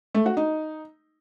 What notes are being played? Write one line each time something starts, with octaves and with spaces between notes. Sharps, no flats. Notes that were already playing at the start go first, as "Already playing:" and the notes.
A3
F#4
D#4